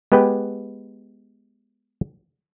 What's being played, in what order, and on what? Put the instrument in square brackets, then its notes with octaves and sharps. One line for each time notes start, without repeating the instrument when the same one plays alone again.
[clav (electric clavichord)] G#3 B3 G4 B4 G5